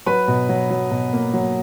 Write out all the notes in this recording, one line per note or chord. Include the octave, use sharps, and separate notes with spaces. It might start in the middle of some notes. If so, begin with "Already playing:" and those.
F#3 B4 B5
B2
F#3
F#3
B2
A#3
F#3